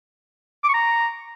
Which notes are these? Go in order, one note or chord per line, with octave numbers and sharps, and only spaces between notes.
D6
C#6
A#5